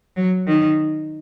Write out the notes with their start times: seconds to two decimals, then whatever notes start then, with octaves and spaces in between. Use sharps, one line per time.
0.16 F#3
0.47 D#3